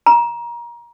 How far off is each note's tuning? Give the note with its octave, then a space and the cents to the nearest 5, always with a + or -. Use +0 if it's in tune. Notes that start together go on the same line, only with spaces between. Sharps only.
A#5 +25